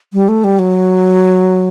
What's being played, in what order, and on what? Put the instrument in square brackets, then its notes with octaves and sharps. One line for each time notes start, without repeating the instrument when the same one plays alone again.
[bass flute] G3
A3
G3
F#3